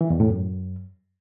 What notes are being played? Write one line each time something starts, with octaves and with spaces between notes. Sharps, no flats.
E3
E2
A2
F#2